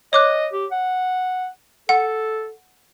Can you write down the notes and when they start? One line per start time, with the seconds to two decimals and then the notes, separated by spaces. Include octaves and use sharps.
0.13 C#5 D#5 D6 F#6
0.53 G4
0.71 F#5
1.89 A4 F#5